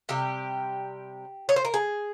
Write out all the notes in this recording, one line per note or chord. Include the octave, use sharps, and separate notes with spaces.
C3 G3 G4
C#5
C5
A#4
G#4